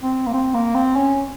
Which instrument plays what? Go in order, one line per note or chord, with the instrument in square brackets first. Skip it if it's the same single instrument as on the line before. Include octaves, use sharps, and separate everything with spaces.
[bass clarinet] C4
A#3
C4
A#3
C4
C#4